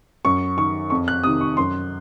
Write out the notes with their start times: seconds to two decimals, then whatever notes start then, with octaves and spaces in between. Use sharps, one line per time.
0.25 F#2 C#6
0.57 D#3 C#6
0.90 F2 C#6
1.08 F#6
1.23 C3 D#3 D#6
1.41 C#6
1.57 F#2 C6